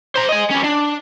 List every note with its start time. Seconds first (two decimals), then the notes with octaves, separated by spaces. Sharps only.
0.15 C5 A#5
0.29 D#5 G#5
0.51 G3 C#4
0.64 D4